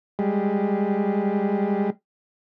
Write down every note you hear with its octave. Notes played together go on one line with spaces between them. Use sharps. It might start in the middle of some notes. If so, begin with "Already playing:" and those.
G3 G#3